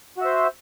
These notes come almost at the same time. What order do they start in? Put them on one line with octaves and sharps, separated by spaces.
F#4 E5 C5